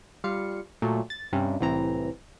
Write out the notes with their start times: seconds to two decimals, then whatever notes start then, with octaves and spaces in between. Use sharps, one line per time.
0.24 G3 F4 F5 C#7
0.82 A#2 F#3 A3
1.10 A6
1.32 G2 C3 G3 C#4
1.60 C2 A2 E3 C4 A#5